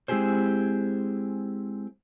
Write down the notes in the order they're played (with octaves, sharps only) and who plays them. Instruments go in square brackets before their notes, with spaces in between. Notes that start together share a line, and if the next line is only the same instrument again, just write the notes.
[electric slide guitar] G#3 C4 E4 G4 G#4 C5